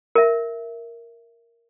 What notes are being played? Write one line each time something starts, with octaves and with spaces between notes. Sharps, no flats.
A#4 E5